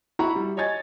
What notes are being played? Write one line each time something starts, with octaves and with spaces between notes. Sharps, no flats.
E4 F#4 F#5 A#5 B5 C#6
G3
C#5 D#5 G#5 G#6 A6